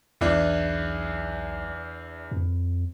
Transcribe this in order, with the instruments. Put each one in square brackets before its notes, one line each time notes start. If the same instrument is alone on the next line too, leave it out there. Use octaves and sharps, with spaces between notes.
[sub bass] B1 [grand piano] E2 E3 D4
[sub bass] F2